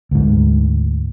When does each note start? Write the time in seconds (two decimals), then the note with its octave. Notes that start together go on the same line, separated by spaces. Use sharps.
0.11 D2 G#2